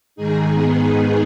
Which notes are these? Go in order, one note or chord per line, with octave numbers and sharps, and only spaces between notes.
G#2 D#3 D#4 G#4
B3